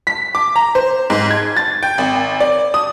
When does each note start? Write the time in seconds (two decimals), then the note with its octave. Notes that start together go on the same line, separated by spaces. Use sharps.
0.07 B6
0.35 D6
0.56 A#5
0.75 C5
1.10 G#2
1.31 G#6
1.57 A6
1.83 G5
1.98 G#1
2.41 D5
2.74 D#6